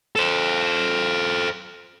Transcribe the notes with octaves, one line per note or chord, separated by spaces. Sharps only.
A4 C5